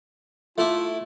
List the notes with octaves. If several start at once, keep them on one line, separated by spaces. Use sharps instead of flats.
A3 E4 F4 D6